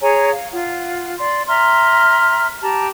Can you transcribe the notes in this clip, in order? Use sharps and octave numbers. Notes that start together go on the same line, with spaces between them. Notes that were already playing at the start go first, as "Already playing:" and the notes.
G#4 C#5 G#5 A#5
F5
F4 F#5
D5 C6
E5 A#5 C6 F6
G4 A5 A#5